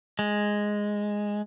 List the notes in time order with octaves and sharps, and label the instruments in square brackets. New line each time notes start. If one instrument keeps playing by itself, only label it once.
[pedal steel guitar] G#3